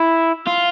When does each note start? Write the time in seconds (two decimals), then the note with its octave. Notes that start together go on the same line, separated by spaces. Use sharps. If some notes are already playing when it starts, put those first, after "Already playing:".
Already playing: E4
0.47 F4